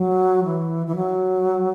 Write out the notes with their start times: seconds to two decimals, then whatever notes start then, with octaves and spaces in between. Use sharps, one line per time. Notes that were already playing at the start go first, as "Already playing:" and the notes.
Already playing: F#3
0.44 E3
0.87 E3
0.96 F#3